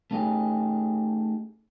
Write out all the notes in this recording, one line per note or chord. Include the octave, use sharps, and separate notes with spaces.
A3 C#4 D#4 G4 G#4